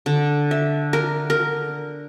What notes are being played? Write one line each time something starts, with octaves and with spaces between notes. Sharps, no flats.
D3
E5
A#4
A#4